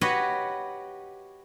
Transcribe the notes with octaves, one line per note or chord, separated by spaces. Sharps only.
F#4 G4 B4 C#5 D#5 F#5